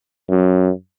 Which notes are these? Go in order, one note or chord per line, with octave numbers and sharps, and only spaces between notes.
F#2